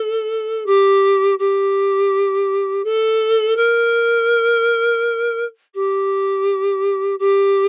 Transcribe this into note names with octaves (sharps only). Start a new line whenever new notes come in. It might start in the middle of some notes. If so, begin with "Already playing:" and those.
Already playing: A4
G4
G4
A4
A#4
G4
G4